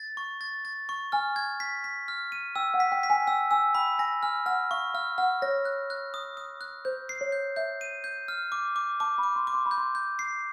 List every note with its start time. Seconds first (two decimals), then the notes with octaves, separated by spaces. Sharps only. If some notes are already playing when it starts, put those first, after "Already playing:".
Already playing: A6
0.17 C#6
0.41 A6
0.65 A6
0.89 C#6
1.12 G#5 F6
1.36 G#6
1.60 B6
1.84 B6
2.08 F6
2.32 D#7
2.56 G5 E6
2.74 F#5
2.80 B6
2.92 G5
3.03 B6
3.10 G#5
3.27 G5 E6
3.51 G#5 E6
3.75 G5 B5
3.99 G#5 A#6
4.23 G#5 F6
4.46 F#5 F6
4.71 F5 C#6
4.94 F5 F6
5.18 F#5 F6
5.42 C#5 A#6
5.65 F#6
5.90 F#6
6.14 D#6
6.37 D#6
6.61 F#6
6.85 C5 G6
7.09 C7
7.21 C#5
7.32 G6
7.56 E5 G6
7.81 D#7
8.04 G6
8.28 F6
8.52 D6
8.76 D6
9.00 A5 D6
9.18 B5
9.23 D6
9.36 C6
9.47 D6
9.54 C6
9.66 B5
9.71 G6
9.77 C6
9.95 G6
10.19 C7